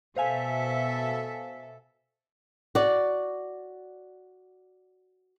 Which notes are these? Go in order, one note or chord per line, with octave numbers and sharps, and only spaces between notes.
B2 A4 C5 E5 F5 G#5
F#4 D5